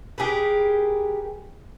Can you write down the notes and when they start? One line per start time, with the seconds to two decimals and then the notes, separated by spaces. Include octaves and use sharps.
0.18 G4 G#4 A#4 B4